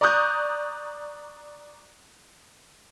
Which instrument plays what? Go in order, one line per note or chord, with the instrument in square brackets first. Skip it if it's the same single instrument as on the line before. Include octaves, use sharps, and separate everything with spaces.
[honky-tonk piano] D5 A#5 C#6 D#6 F#6 G6